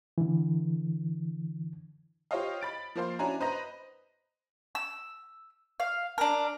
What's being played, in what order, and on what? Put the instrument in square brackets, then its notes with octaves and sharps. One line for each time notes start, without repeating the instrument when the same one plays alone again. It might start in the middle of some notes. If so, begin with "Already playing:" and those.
[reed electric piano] D3 E3
[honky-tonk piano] F4 G4 C5 C#5 D#5 F5
B5 A6 D7
F3 A#3 C5 F5 C6
C#4 D4 E4 F#4 G#5 A#5
B4 C5 D#5 A#5 B5 A#6
[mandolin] E6
F5
D4 A#4